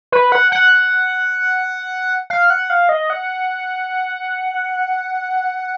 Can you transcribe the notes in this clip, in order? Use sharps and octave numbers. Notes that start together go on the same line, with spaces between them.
B4
F#5
F#5
F5
F#5
F5
D#5
F#5